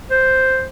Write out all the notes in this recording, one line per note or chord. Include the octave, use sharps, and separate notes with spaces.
C5